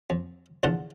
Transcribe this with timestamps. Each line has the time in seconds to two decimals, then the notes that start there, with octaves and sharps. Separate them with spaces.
0.10 F2
0.63 A#1 E2 D3 F4 F#5 A5